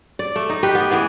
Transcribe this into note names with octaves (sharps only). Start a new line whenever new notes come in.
D5
A3
D#4
G4 B4 G5
B3
E3 B3 G#4